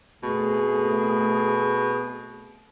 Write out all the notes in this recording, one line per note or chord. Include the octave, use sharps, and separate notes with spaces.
B2 A3 C4 G#4